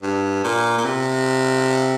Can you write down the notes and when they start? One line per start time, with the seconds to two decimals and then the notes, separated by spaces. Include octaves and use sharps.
0.03 G2
0.44 A#2
0.78 A#2
0.85 C3